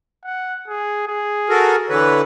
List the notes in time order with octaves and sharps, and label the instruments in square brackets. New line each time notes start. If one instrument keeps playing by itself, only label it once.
[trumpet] F#5
G#4
G#4
[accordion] F#4 A4 A#4
[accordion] D3 E3 B4 [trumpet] C#5